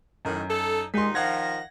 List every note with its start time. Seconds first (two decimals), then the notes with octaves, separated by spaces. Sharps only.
0.25 F#2 A2 D#3
0.48 D#4 A4
0.94 D#2 A#2 G#3 D#4 C6 B6
1.15 D#3 F3 F5 F#5 G#6 A#6